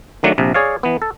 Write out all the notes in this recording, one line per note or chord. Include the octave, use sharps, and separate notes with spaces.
D#3 F#3 A3 D4
A#1 C3
G#4 C#5 D5 F5
E3 B3
A4